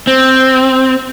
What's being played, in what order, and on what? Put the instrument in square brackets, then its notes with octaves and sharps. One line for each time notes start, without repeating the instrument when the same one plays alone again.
[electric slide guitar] C4